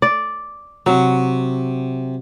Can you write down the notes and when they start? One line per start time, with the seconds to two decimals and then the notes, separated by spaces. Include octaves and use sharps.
0.02 D5
0.86 C3 F#3